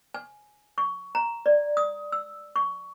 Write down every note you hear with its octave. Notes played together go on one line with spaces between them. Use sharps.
G#5
C#6
A#5
D5
D#6
E6
C#6